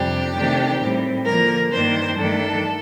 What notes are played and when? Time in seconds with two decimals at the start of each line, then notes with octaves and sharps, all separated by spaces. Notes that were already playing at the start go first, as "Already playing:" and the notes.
Already playing: F2 C3 G3 D4 G4
0.35 C3 D#3 A3 D4
0.81 A2 G3 C4
1.26 D3 F3 A#3 A#4
1.73 G2 D#3 A#3 D4 C5
2.18 G2 D#3 A3 D4 A4